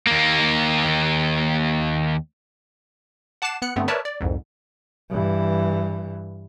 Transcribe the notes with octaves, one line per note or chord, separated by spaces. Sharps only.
D#2 A#3
F#5 A5 D6 F#6 C7 E7
B3 F#6 C#7
G2 D3 A3 B3 C4
A#4 B4 C#5 D5 E5 A5
D5
C2 F2 G#2
G2 E3